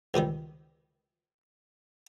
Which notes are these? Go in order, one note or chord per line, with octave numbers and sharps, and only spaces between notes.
C#2 C3 D#3 G3